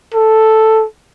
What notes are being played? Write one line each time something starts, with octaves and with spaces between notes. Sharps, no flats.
A4